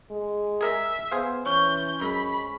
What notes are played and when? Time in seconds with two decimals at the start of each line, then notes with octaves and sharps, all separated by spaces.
0.11 G#3
0.61 G#4 A#4 D#5 E5
1.11 B3 G#4 C5 F5
1.46 E3 C#4 G6
2.01 F#2 G#3 B5